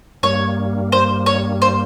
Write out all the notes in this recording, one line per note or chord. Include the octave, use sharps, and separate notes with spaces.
G2 G3 A#3 C#5
C5
C#5
C5